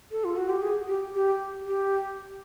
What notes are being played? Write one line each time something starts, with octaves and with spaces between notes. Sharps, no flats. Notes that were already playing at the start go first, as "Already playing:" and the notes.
A4
F4
F#4
G4
G#4
G4
G4
G4